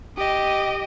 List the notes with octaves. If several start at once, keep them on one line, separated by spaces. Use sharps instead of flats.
G4 D#5